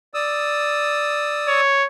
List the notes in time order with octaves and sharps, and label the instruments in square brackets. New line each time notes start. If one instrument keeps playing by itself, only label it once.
[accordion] D5 D#6 E6
[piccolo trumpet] C#5